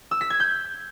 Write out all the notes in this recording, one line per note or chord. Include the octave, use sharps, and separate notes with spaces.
E6
B6
G#6
G6